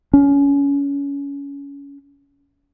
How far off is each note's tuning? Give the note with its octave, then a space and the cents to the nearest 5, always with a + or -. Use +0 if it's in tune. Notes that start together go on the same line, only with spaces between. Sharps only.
C#4 +25